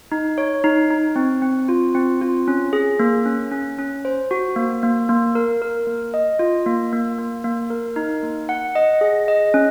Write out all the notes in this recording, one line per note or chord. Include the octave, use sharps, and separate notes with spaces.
D#4
C#5
D#4
D#4
C4
C4
F4
C4
F4
C#4
G#4
A#3
C#4
C#4
C#4
C5
F#4
A#3
A#3
A#3
A#4
A#4
A#3
D#5
F4
A#3
A#3
A#3
A#3
A#4
D#4
A#3
F#5
D#5
G#4
D#5
C#4